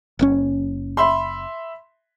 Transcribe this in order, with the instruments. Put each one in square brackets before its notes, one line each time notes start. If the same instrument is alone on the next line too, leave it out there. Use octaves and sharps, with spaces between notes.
[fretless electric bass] F#1 A#2 C#4
[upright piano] E5 B5 C6